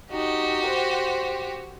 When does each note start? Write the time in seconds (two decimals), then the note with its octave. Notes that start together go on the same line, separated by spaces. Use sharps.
0.11 D#4 F#4 G4
0.67 C5